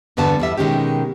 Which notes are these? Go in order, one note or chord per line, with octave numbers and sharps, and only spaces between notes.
E2 G2 D3 B3 F#4 A5
E2 G3 E5
B2 D#3 G#3 C#4 G4